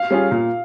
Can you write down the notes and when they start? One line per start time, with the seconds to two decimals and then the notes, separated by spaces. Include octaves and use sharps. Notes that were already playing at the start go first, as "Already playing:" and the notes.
Already playing: F5
0.11 G3 C#4 F4 G#4
0.31 A#2